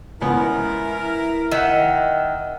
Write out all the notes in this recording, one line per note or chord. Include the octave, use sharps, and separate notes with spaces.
C#2 B3 E4 A#4
D#3 E5 F#5